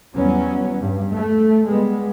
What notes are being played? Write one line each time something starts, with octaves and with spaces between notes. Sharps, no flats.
E2 F#3 G3 B3 C#4
G2
A3
G3 G#3 B3